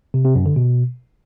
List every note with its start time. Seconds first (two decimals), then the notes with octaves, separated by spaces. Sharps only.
0.14 C3
0.25 C3
0.35 F#2
0.46 D3
0.56 B2